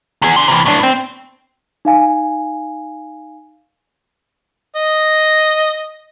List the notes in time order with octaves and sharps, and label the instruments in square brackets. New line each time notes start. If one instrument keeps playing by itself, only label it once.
[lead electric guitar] E2 G#4
D4 C6
C3 E3
A2 D4
C4
[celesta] D#4 F5 G#5
[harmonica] D#5